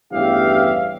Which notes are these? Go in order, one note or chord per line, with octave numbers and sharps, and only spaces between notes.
A1 E2 G2 G4 E5 F5